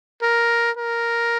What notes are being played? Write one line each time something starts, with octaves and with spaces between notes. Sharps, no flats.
A#4
A#4